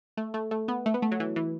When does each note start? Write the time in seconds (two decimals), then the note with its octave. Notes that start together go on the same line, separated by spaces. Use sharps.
0.17 A3
0.34 A3
0.51 A3
0.68 B3
0.86 A3
0.94 B3
1.02 A3
1.11 F#3
1.20 E3
1.36 E3